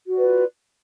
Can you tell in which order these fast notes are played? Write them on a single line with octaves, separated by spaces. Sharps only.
F#4 D5 B4 F4